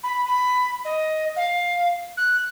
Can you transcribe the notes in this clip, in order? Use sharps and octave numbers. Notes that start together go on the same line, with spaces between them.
B5
B5
D#5
F5
F#6